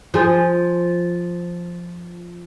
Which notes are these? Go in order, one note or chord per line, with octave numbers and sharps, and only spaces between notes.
F3 G#4